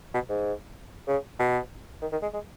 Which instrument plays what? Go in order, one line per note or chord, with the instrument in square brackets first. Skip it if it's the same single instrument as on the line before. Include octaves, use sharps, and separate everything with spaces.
[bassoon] B2
G#2
C#3
B2
D#3
D#3
G#3
G#3